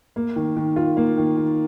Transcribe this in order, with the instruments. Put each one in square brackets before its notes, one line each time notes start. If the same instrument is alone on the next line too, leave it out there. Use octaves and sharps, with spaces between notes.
[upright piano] A#3
D#3
D#3
F4
A#3
D#3
D#3